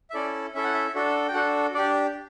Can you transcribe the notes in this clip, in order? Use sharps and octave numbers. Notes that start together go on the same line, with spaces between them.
E5
C#4 E4 A4 D5
C#4 E4 A4 E5
F#5
E5
D4 F#4 A4
G5
D4 F#4 A4 F#5
D4 G4 D5